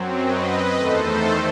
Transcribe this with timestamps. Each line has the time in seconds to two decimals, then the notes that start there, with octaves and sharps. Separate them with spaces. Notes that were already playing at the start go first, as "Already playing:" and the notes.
Already playing: F#2 F#3 C4
0.21 B4 D#5
0.74 E2 D#3 A3 A4 C5